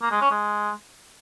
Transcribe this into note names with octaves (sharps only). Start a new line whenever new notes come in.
A#3
G#3
C#4
G#3